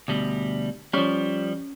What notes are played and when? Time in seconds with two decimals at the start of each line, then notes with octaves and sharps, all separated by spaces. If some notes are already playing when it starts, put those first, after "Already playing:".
0.08 D2 B2 G3
0.93 F3 G3 C#4